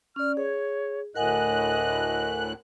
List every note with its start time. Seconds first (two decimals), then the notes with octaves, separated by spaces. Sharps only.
0.16 C#4 D5 F6
0.37 G#4 C#5
1.15 D2 A2 A#4 D#5 F#5 G#5 F#6